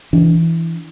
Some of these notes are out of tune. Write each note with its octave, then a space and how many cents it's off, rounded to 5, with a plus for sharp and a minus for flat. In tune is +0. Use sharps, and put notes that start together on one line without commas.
E3 +0 D4 -15